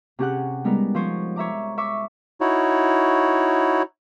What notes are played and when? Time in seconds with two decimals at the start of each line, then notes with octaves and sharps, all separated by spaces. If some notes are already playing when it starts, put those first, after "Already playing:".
0.19 C3 C#4 G4 G#4 F#5 F#6
0.64 G3 G#3 B3 D#4 A#4
0.95 F3 C5 C#5
1.36 C#5 E5 A#5 D6
1.78 E5 C#6 D6 E6
2.41 D#4 E4 F#4 C#5